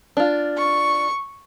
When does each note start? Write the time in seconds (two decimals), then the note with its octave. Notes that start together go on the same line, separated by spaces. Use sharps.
0.17 D4 F4
0.57 C#6